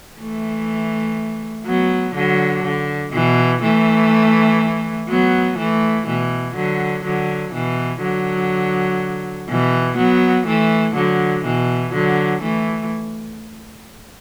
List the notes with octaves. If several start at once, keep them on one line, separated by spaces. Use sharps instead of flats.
E3 A3
F#3 B3
D3 F#3
D3
B2 E3
E3 A3
F#3 B3
E3 A3
B2 E3
D3 F#3
D3 F#3
B2 E3
D3 F#3
B2 E3
F#3 B3
E3 A3
D3 F#3
B2 E3
D3 F#3
E3 A3